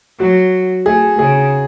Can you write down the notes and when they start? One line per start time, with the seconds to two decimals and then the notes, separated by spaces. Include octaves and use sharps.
0.19 F#3 F#4
0.86 A3 G#4
1.19 C#3 G#4